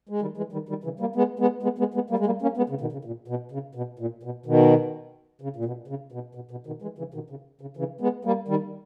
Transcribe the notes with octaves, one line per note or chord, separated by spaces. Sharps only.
G#3
D#3 G3
E3 G#3
D#3 G3
D#3 G3
C#3 E3
G3 A#3
G#3 B3
G#3 B3
G#3 B3
G#3 B3
G#3 B3
G3 A#3
G#3
G3 A#3
A#3 C#4
G#3 B3
C#3
B2 D#3
C#3
A#2
B2
C#3
B2
A#2
B2
B2 D#3
C#3
A#2
B2
C#3
B2
B2
B2
B2 D#3
E3 G#3
C#3 E3
B2 D#3
C#3
C#3
C#3 E3
G#3 B3
G3 A#3
D#3 G3